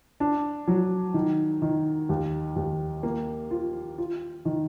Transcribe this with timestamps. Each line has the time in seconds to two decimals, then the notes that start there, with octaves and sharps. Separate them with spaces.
0.20 D4
0.68 F#3
1.14 D#3
1.62 D#3
2.09 D#2
2.56 D#2
3.03 A#3
3.51 F4
3.98 F4
4.45 D#3